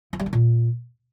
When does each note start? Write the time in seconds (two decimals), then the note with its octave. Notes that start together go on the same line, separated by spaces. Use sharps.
0.13 F3
0.20 G3
0.26 D#3
0.33 A#2